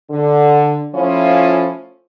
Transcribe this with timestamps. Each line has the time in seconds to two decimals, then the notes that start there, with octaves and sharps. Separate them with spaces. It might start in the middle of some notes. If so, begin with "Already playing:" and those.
0.10 D3
0.94 F3 A3 C#4 E4 F4